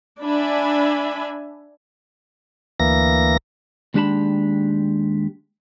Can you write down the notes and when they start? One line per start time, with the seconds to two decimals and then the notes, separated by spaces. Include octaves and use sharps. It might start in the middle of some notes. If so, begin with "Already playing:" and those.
0.21 D4 E5 G#5 B5
2.80 D2 E3 A#3 A#6
3.94 D#2 G#3 D4 G4 A5 B5